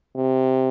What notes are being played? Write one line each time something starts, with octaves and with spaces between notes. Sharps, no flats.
C3